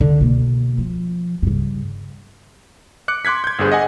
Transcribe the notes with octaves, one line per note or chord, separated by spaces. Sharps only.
D3
B2 A#3
F3
G2 C#3
D6 F#6 C#7
C6 D6 F#6 G#6 B6
G6 G#6
G1 G2 G#4 C5
D#5 F#5 G#5